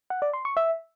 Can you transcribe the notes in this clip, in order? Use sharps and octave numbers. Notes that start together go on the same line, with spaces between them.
F#5
D5
C6
C#6
E5